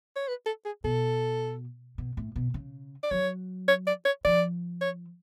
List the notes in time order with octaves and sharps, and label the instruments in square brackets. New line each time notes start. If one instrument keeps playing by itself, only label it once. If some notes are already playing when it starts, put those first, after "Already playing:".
[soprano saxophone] C#5
B4
A4
G#4
[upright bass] B2 [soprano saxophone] A4
[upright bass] B2
A2
B2
C#3
[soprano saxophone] D5
[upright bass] F#3 [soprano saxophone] C#5
[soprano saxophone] C#5
D5
C#5
[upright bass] F3 [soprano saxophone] D5
[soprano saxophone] C#5